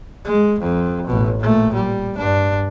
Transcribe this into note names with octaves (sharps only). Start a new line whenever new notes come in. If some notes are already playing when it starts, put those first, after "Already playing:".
G#3
F2
A1 B2
A#2 A3
G3
G2 D4